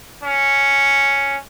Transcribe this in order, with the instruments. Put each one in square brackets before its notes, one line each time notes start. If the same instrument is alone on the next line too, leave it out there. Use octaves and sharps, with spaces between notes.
[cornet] C#4